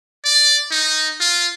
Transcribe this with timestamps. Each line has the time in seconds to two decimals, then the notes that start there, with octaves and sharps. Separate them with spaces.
0.24 D5
0.71 D#4
1.20 F4